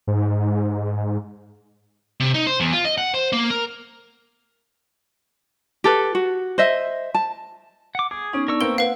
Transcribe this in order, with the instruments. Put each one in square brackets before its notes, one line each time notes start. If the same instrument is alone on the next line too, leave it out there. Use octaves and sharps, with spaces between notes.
[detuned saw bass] G#2
[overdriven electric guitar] C3
D#4
C5
E2
F4
D#5
F#5
C5
A#3
A#4
[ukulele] G4 A4 B4
F#4
C5 D#5 E5
A5
[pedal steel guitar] F#5 D6
[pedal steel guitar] G#4 [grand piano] D6
[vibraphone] B3 D#4 [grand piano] C#4
[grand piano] D4 [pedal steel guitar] A#4 C#6 E6
[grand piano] A#3 C4 D7 [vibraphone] B4 [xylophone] G7
[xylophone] B4 F5 [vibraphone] F#5